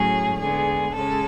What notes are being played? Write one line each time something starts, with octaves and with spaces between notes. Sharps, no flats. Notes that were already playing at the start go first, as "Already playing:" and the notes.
Already playing: A2 F#3 A3 C#4 G#4
D3 G#3 B3 G#4
C#3 G#3 C#4 A4